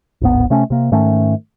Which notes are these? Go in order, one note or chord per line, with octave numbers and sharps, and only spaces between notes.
D1 G#1 B3
C3 A3 C#4
C3 A#3
G#2 D#3 A3 C#4